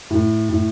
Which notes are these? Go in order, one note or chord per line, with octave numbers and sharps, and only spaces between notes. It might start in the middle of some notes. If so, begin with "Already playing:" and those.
A2
A2